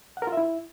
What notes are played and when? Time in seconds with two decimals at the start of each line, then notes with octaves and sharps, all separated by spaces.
0.17 F#5
0.22 A#4
0.27 F4
0.32 E5
0.37 E4